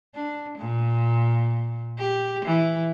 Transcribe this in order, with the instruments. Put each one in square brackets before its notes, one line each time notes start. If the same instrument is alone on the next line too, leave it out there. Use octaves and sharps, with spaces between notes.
[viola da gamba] D4
A#2
G4
E3